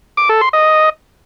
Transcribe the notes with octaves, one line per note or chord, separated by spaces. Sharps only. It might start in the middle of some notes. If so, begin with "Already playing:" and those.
D6
A4
C6
D#5